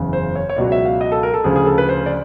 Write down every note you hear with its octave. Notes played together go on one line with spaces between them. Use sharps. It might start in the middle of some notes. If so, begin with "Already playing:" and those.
Already playing: F#1 E2 C#3 E3
C5
C#5
C#5
C#2 B2 F#3 D5
E5
F5
D#5
A4
A#4
A4
D2 C#3 F3 G#4
G#4
A4
B4
C5
D5